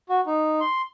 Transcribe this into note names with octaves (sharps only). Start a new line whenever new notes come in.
F#4
D#4
C6